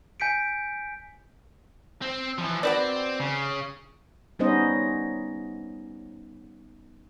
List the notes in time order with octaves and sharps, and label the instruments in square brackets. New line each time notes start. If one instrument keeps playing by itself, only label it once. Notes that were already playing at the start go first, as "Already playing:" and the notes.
[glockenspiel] G#5 G6 B6 C#7 D7
[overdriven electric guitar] C4
E3 F3
[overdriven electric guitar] C4 [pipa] F#4 B4 D5
[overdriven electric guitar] C#3
[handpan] G3 B3 C#4 D#4 C5 D#5